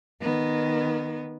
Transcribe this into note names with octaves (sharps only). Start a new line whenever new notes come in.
D#3 B3